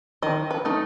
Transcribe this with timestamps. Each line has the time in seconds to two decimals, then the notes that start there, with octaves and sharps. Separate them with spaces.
0.22 D#3 D#5
0.51 B4
0.65 A3 D#4